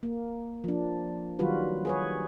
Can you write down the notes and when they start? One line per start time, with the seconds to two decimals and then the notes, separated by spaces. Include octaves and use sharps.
0.03 A#3
0.64 F3 D4
1.39 D#3 F#3 G3 F4 F#4 B4
1.85 G#4 B4 C#5